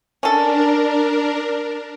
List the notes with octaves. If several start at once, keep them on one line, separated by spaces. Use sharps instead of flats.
C#4 D4 A4 A#4